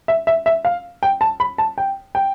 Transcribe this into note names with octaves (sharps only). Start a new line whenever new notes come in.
E5
E5
E5
F5
G5
A5
B5
A5
G5
G5